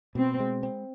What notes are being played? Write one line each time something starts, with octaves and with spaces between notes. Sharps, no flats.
B2 C4
G#3
C4